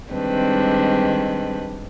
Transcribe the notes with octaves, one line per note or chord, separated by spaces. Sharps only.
D#3 G3 G#3 C4 D4 B4